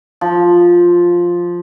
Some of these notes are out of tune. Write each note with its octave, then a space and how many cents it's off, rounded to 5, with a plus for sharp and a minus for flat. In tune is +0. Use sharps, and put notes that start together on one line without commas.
F3 +5